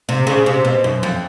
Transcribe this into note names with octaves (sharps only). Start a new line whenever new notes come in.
C3
C#3
C3
B2
F#2
F2